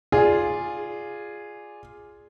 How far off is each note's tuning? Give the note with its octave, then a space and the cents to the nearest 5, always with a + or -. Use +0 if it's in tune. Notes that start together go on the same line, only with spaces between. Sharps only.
F4 +0 G#4 +0 D5 +0